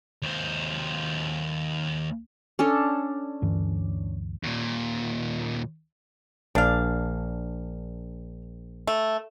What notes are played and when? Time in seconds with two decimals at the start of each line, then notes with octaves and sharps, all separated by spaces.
0.22 D#2 C5
2.59 C#4 D4 A4
3.42 D2 G2 E3
4.43 D#2 A#2
6.55 A#1 D4 D5 F5
8.87 A3